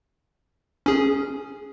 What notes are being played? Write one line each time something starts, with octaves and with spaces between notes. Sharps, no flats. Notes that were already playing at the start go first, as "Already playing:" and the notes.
C#4 G#4